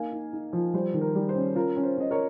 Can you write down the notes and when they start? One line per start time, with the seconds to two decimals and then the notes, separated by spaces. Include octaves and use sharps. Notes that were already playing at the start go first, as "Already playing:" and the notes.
Already playing: A#3 D#4 F5 G#5
0.12 D#4
0.33 D#4
0.53 F3
0.74 G3 C5
0.94 D#3
1.01 A#4
1.15 G3
1.29 C5
1.35 C#4
1.56 F4 A#4
1.77 C#4
1.83 C5
1.97 C#4 D#5
2.11 A#4 C#5